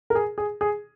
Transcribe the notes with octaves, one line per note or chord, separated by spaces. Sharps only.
A#4
G#4
G#4
G#4